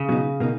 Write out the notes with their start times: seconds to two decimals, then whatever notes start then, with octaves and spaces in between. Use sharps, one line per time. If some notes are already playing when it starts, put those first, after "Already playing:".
Already playing: C#3
0.09 B2 F#3 B3 D#4
0.40 B2 A#3 D#4